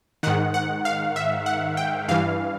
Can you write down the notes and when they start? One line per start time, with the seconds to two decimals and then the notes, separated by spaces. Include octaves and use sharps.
0.23 G#2 D#3 F#5
0.54 F#5
0.85 F5
1.16 E5
1.46 F#5
1.77 G5
2.08 G2 E3 F5